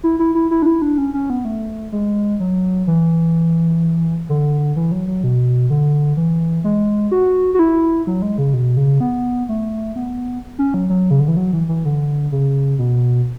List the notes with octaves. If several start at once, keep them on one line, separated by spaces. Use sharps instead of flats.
E4
E4
E4
E4
D4
E4
D4
C#4
C#4
B3
A3
G#3
F#3
E3
D3
E3
F#3
F#3
B2
D3
E3
G#3
F#4
F#4
E4
F#3
G#3
C#3
B2
C#3
B3
A3
B3
C#4
F#3
F#3
C#3
D3
E3
F#3
E3
E3
D3
C#3
B2